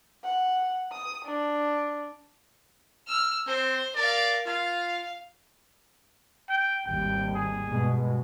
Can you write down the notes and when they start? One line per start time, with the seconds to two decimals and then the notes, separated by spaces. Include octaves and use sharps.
0.24 F#5
0.92 D#6
1.25 D4
3.07 E6 F6
3.47 C4 C5
3.96 A#4 D5 F5
4.46 F4 F5
6.49 G5
6.86 G#1 D#2 G3 G5
7.35 G#4
7.69 G2 B2 G#3